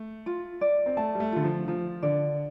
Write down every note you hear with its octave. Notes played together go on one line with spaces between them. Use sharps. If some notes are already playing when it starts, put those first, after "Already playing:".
Already playing: A3
F4
D5
C4
A3 A5
G3
A3
D3 F4
F3
F3 F4
D3 D5